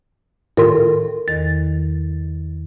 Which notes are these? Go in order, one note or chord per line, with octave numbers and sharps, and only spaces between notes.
A2 D#3 F4 A4 A#4
E2 D#3 A6